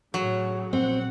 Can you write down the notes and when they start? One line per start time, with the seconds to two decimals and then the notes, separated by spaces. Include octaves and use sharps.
0.14 A2 C#3 F#3
0.73 A#1 C4 F#5